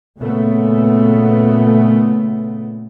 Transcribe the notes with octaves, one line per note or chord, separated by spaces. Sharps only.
A#2 C#3 A3 B3